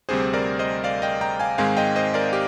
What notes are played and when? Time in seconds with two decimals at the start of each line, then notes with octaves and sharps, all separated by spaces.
0.09 D2 C3 G3 C4 G#4 C5
0.34 A#4 D5
0.59 C5 D#5
0.84 D5 F5
1.02 D#5 G5
1.21 G5 A#5
1.39 F5 G#5
1.58 G#2 D#3 G#3 C4 F5 G#5
1.77 D#5 G5
1.96 C5 D#5
2.14 A#4 D5
2.33 G4